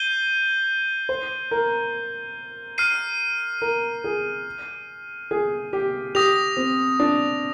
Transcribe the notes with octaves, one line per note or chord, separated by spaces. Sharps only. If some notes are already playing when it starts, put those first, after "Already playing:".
Already playing: G6 C7 D#7 G7
C5
A#4
F6 C7 D#7
A#4
G#4
G#4
G4
G4 D#6 A#6 F7
C4
D4